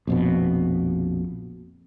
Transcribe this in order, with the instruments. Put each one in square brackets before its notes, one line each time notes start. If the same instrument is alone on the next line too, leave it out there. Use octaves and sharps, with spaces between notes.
[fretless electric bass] A#1 F2 B2